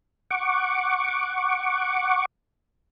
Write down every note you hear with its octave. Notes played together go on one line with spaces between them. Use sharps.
F#5 C#6 D6